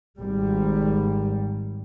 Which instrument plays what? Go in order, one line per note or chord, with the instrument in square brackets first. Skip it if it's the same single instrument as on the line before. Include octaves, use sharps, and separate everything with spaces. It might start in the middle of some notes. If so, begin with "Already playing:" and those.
[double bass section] G#1 G3